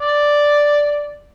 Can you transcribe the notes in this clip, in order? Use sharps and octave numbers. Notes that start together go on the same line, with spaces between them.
D5